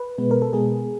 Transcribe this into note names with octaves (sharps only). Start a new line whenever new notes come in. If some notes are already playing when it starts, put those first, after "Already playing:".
Already playing: B4
B2 G#3 B3
A#4
A4
B2 G#3 B3 G#4